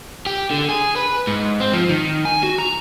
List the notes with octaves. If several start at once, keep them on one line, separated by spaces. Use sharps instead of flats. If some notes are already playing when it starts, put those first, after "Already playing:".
G4
D3
G#4
B4
G#2
C4
F3
D#3
G#5
F#4
A#5